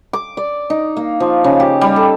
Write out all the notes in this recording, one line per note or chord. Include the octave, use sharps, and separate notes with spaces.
D6
D5
D#4
A#3
F3
C#3
G4
G3
A4